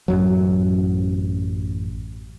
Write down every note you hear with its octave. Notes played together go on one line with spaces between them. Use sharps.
A1 F#2 F#3